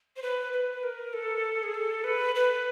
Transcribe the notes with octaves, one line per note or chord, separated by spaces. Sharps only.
C5
B4
B4
B4
A#4
A4
G#4
A4
B4
B4